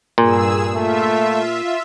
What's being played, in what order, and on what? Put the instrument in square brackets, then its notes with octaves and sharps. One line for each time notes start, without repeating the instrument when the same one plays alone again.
[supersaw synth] G2 G#4 E6 [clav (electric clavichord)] A#2
[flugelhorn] A3 [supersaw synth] F4 E5